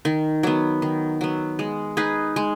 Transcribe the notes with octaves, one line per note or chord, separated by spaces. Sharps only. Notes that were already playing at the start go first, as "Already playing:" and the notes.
D#3
F#3 B3
D#3
F#3 B3
G#3
D#4 G#4 B4
G#3